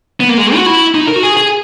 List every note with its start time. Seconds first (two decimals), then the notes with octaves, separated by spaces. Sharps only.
0.20 B3
0.29 A#3
0.37 G#3
0.55 F#4
0.66 E4
0.95 D#4
1.08 A#4
1.16 F#4
1.23 G#4
1.37 G#4